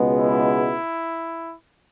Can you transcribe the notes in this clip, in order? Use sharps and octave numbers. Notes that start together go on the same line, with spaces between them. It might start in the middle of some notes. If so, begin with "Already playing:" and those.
Already playing: C#2 B2 G#3 B3
E4